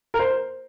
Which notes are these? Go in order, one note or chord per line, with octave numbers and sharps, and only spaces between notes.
A#4
C5